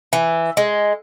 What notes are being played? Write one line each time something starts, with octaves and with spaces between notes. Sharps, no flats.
E3
G#3